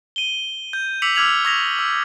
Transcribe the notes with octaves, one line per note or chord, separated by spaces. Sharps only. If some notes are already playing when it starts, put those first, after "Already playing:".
D#7 G7
G6
D6 E6 B6 C#7 F7 F#7
D6 E6 F6 G#6 F7 F#7
C#6 D#6 G#6 A#6 B6 F7
E6